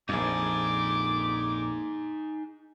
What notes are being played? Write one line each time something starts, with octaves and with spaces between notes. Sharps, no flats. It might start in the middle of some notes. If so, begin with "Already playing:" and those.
A#1 F2 D#4 G#4 D6